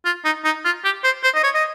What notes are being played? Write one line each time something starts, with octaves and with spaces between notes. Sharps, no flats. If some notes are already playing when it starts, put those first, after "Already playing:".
F4
D#4
D#4
F4
G4
C5
C5
D#5
C#5
D#5